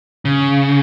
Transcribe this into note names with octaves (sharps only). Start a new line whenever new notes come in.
C#3